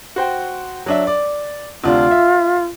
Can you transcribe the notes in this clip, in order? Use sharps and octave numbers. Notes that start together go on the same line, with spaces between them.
F#4 C5 G5
F#3 D4 E5
D5
D2 C3 D4 F4
E5